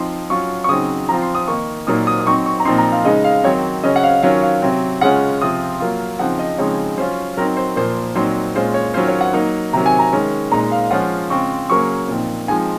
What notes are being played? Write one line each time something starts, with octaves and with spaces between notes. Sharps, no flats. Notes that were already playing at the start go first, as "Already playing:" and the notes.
Already playing: F3 C4 D#4 C6
F#3 C#4 F4 C#6
C#6
C#3 F#3 C4 D#4 D#6
F3 C4 F4 A#5
C6
D#6
D#3 A#3 D#4 C#6
A#2 F#3 A#3 D#4 D#6
D#6
D#6
F#3 C4 D#4 C#6
C#6
A#5
A#2 F3 C4 D#4 C6
A#5
F5
C#3 G#3 D#4 D#5
F5
D#3 F#3 C4 D#4 C#5
C#3 F#3 C#4 D#5
F#5
F5
D#3 F#3 C#4 F4 F5
F5
C3 F#3 C4
C#3 G#3 C#4 F4 F#5
C3 F3 C4 F4 D#6
F#3 A#3 F4
C#3 F3 C4 D#4 F#5
D#5
C#3 F3 G#3 C4 D#4 C#5
F#3 C#4 F4 C5
F#3 C4 D#4 A#4
C5
A#2 F3 A#3 C5
A#2 F#3 C4 D#4 C5
A#2 G#3 C#4 F4 C5
C#5
D#3 F#3 C#4 F4 C5
C#5
F#5
F#3 A#3 D#4
C3 D#3 F#3 A#5
G#5
A#5
D#3 G#3 C#4
A#2 G#3 D#4 A#5
F5
F3 G#3 C#4 F4 F#5
C#3 G#3 C4 F4 C#6
C#3 F#3 A#3 C#4 C#6
A#2 F3 C4 D#4
F3 G#3 C4 D#4 G#5